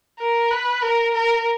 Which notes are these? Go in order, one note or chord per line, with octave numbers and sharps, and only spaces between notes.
A#4
B4
A#4
A#4